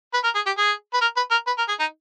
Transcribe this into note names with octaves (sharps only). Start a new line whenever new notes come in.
B4
A#4
G#4
G4
G#4
B4
A#4
B4
A#4
B4
A#4
G#4
D#4